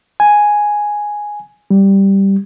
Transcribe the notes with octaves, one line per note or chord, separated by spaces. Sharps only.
G#5
G3